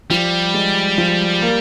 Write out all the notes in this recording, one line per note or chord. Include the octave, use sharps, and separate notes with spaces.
F3 G3
G#3
F3
A#3